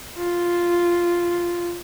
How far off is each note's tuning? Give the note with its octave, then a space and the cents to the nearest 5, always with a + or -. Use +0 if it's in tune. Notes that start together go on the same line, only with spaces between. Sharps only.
F4 -5